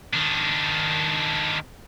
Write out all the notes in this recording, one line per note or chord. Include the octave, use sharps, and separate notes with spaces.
D#3 D4